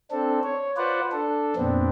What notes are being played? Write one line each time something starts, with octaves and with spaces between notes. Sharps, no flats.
C4 D4 A4
C#5
F4 B4 C5 D5 F#5
D4 A4
F2 A#2 B3 C4 D4